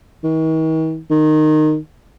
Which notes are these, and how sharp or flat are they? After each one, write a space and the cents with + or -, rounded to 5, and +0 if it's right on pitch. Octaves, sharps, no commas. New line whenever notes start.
D#3 +45
D#3 -15